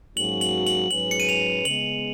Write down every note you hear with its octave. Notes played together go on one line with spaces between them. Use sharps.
G#2 F#3 A#3 C#4 F#4 F#7
F#7
F#7
G#2 F#3 C#4 G#4 B4 F#7
C#7
D#7
F7
C#3 G#3 B3 F#7